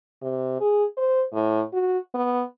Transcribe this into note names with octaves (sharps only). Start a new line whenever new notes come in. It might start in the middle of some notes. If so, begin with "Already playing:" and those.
C3
G#4
C5
A2
F#4
B3